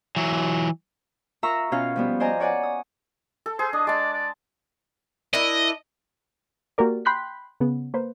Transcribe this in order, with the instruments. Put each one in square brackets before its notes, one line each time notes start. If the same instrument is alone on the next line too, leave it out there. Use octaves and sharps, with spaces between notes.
[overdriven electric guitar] E3 F#3
[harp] F4 A#4 E5 A#5 C#6 E6
B2 C#4 F4 F5
F3 G3 B3
C5 D5 D#5 G#5 A#5
C#5 D5 F#5 G#5
D#6
[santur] A4
[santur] G#4 [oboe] C5
[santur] D4 [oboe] D#5
[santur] G#3 A5 [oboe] D5
[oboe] D5
[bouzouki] D4 E4 A#4 [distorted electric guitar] D#5
[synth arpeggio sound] A#3 F#4 G4 A#4 D5
G5 B5 C6 F#6 G6 B6
C#3 B3
A#3 B4 C5